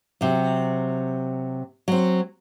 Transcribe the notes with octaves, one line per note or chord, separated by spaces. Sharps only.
C3 F#3
F#3 C4